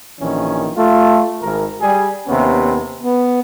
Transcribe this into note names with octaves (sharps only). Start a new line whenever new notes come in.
A#1 D#3 E3 C#4
A3 F4
G#1 A#4
G3 G#4
D#2 C3 B3 C#4
B3